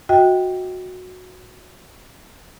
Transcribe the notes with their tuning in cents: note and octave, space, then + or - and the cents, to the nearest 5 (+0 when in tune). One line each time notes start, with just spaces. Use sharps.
F#4 -15 D#5 +35 G5 +0